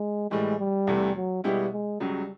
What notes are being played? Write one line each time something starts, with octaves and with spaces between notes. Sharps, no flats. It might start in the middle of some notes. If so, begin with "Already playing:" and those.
Already playing: G#3
A2 E3 G3 G#3
G3
E2 C3 E3 A3
F#3
B2 G3 G#3 B3 E4 G4
G#3
C#2 C#3 F#3 G3